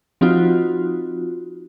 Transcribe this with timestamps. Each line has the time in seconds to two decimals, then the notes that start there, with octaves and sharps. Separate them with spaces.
0.21 F3 C4 D#4 F4 F#4